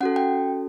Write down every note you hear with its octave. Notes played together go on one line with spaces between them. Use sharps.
C#4 F#4 A4 F#5
G5